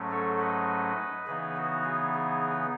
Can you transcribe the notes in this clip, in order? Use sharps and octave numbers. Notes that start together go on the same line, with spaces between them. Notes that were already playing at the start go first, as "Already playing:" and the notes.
Already playing: G#2 F#3 A3 C#4
A4 C#5
B4 D#5
C#3 E3 B3 D#4 G#4 B4
F#4
G#4
G#4